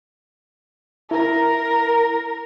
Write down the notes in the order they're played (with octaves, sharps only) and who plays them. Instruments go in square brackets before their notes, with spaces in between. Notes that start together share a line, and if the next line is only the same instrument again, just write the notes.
[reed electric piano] E4 [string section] A#4